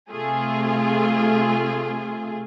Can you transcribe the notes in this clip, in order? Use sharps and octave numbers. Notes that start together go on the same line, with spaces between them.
C3 A3 F4 G#4